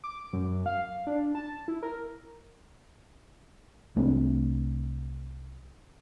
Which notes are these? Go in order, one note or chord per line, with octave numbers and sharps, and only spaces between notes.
D6
F#2
F5
D4
A5
E4
A#4
C2 A3 C4 D4